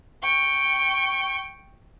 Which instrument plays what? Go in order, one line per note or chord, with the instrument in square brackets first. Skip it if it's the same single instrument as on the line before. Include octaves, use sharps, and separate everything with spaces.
[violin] G5 C#6